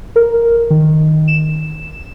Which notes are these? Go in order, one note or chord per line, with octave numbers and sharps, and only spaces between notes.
A#4
D#3
E7